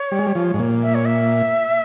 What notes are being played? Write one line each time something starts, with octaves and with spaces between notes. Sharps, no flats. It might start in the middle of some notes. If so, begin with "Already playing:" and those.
Already playing: C#5
G3
G#3
G3
F3
G#2
A#2
E5
C#5
E5